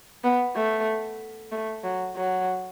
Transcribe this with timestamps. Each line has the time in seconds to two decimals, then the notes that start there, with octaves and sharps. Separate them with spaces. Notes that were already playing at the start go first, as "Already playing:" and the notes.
0.24 B3
0.55 A3
1.52 A3
1.84 F#3
2.16 F#3